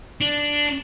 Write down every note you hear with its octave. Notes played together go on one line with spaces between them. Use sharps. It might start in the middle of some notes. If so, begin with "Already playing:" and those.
D4